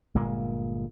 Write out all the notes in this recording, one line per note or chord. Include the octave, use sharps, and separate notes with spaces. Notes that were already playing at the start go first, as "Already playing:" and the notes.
G1 A#2 G#3 A#3